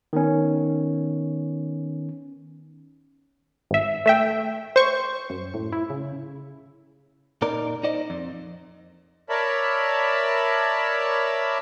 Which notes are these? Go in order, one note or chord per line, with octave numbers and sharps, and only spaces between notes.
D#3 B3 C#4
G#1 E5
A3 E5 G5
C5 C#6
F#2
A2
E4
C#3
A#2 D#4 A#4 D5
D#4 C5 D5 D#5
F2
A#4 C#5 D5 E5 A5 B5